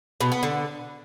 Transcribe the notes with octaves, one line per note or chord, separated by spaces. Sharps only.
B2
B3
D3